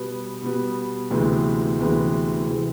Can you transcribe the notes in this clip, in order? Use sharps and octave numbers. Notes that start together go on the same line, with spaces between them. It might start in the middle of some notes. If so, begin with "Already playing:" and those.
Already playing: B2 G3 B3
B2 G3 B3
D2 C3 E3 G#3 B3
D2 C3 E3 G#3 B3
C3 E3 G#3